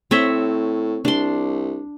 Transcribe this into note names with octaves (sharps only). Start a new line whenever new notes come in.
A2 C4 C#5 E5
C2 D4 C6